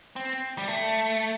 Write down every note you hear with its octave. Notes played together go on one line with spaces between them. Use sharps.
C4
G3
A3